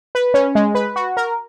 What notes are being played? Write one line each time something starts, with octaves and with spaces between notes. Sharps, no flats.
B4
C#4
G#3
B4
F#4
A#4